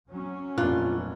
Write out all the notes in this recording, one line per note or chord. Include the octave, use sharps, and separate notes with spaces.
F#3 C#4
F1 A#2 D4 F4 F#6